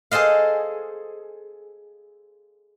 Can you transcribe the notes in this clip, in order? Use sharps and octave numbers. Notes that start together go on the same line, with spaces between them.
G#4 A4 C5 D#5 F5